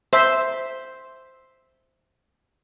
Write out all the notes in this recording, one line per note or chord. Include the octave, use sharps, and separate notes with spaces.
C5 E5